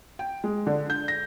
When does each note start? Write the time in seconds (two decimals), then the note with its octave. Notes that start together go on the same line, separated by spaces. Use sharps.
0.19 G5
0.44 G#3
0.67 D3
0.90 G6
1.08 A#6